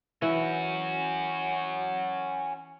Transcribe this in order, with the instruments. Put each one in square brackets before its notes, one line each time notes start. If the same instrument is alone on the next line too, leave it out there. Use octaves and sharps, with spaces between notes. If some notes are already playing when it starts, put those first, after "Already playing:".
[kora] E3 [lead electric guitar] C#4 F#4